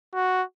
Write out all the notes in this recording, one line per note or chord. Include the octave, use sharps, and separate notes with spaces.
F#4